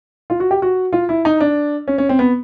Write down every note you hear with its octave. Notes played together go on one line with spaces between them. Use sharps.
F4
F#4
G4
F#4
F4
E4
D#4
D4
C#4
C#4
C4
B3